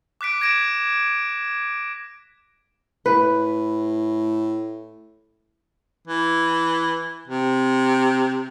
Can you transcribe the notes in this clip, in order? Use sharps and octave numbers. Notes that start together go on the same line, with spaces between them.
D6 F#6 B6 D7
G#6 A#6 D7 E7
A2 B4
E3
C3